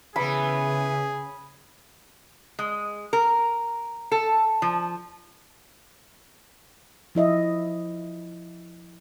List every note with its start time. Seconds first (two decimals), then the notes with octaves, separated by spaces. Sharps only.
0.16 C#3 E3 B3 G#4 B5
2.59 G#3
3.13 A#4
4.12 A4
4.62 F3
7.15 F3 E4 D#5 E5